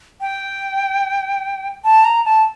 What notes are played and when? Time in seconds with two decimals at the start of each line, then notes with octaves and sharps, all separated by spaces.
0.21 G5
1.84 A5
2.05 A#5
2.25 A5